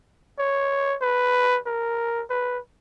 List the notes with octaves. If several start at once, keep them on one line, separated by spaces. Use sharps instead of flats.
C#5
B4
A#4
B4